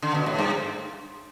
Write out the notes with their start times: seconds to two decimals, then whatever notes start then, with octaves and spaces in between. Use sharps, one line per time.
0.02 D3
0.14 B2
0.26 A2
0.38 G2